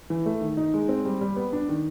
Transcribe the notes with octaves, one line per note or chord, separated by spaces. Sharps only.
E3
A3
D#3
D#4
G#3
C4
G3
G3
B3
D4
D#3